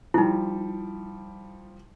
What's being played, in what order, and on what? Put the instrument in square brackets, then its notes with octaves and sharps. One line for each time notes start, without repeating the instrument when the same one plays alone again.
[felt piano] F3 G3 [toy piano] D#4 E4